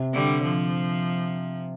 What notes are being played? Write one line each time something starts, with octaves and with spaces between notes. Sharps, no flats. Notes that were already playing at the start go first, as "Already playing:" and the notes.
Already playing: C3
D3 G3
F3